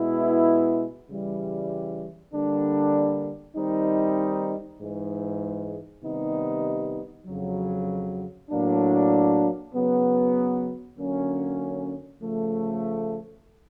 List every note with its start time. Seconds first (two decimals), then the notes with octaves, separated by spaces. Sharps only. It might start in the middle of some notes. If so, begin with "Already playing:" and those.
Already playing: B2 G#3 B3 E4
1.09 C#3 E3 G3
2.33 D3 G3 A#3 D4
3.56 D#3 G3 C4 D#4
4.80 G#2 E3 G#3
6.03 C3 D#3 G3 B3 D#4
7.26 F2 C#3 F#3
8.50 A2 F#3 A#3 D4
9.74 C#3 F#3 B3
10.97 D3 F#3 A#3 C#4
12.21 C#3 F3 A3